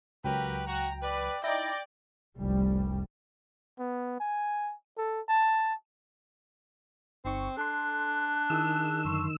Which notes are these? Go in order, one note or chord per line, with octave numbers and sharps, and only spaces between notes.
C#2 F#3 F#4 G4 A#4 B4 G5
F#4 A#5
B4 D5
D#4 E4 D5 G5 A#6
F1 C2 G3
B3
G#5
A4
A5
G1 C4 D#4 C#6
D4 A4 C6 F#6
D#3 E4 G#4 D#6 E6
F#2 D3 C6 C#6